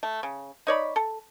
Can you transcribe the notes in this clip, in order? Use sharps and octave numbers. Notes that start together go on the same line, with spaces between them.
A3
C#3
D#4 C#5 D5 B5
A4